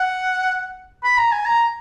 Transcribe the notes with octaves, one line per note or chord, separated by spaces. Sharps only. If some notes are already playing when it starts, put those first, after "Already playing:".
Already playing: F#5
B5
A#5
G#5
A#5